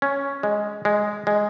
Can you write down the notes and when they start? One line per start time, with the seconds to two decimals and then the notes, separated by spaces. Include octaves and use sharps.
0.02 C#4
0.43 G#3
0.85 G#3
1.27 G#3